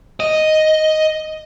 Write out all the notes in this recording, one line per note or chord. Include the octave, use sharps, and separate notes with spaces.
D#5